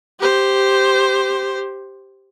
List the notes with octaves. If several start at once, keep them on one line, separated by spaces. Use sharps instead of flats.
G4 C5